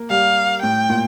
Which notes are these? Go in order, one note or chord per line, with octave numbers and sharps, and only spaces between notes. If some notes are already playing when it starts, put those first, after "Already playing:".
Already playing: A#3
G3 F5
A2 G5
A#2